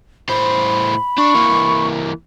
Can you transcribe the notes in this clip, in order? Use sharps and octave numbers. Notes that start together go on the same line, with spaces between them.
A2 C5 B5
D4 C#6
E3 A#3